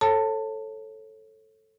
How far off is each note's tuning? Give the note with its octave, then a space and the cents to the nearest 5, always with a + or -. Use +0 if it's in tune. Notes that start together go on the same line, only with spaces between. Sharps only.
A4 +0 C#5 -30 A5 +20